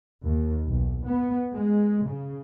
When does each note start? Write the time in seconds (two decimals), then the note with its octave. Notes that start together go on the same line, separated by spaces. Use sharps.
0.24 D#2
0.67 B1
1.05 B3
1.53 G#3
2.05 C#3